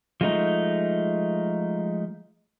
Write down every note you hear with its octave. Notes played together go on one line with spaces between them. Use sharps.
F3 G#3 A3 D4 D#4